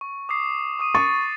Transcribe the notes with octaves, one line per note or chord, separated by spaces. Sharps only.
C#6
D6 D#6 C7
C#6 D#6 D#7
C#6 A6